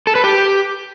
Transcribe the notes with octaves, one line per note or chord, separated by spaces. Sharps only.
A4
B4
G4